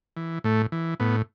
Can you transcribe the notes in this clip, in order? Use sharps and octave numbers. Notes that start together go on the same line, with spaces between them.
E3
A2 A3
E3
A2 B3